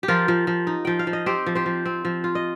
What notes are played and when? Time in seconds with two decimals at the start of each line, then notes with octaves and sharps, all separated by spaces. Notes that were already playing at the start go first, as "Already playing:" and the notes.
0.03 G4
0.08 F3 F4 A#4
0.28 F3
0.47 F3
0.67 D#4
0.85 F3 G5
0.99 F5
1.07 F3
1.13 D#5
1.26 C4 G4 C5
1.47 F3
1.55 G4 C5
1.66 F3
1.85 C4
2.05 F3
2.24 F4
2.35 D#5